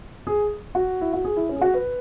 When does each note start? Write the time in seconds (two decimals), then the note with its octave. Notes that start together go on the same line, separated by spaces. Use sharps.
0.27 G#4
0.75 F#4
1.01 E4
1.13 F#4
1.25 G#4
1.37 E4
1.49 C#4
1.56 G#4
1.61 F#4
1.74 B4